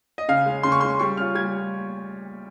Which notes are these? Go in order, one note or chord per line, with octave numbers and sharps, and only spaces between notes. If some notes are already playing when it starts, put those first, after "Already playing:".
D#5
C#3 F5
G#3 C#4
C#3 C6
C#6
G#3 C#4 C6
G3 C#6
C#4 F4 F6
G3 G#6